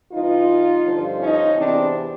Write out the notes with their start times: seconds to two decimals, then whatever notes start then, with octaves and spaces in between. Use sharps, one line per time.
0.13 G2 E3 D#4 F4
0.84 G2 D3 F3
1.19 C#4 D#4
1.55 E2 C3 E3 C4 D4